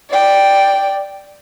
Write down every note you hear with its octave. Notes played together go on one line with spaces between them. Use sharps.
D5 G5